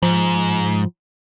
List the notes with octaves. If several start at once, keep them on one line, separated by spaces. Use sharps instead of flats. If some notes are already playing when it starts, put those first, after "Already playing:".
G#2 F3